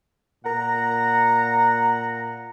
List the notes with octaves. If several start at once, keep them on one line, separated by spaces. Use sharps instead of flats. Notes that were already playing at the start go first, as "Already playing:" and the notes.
A#2 F#5 A#5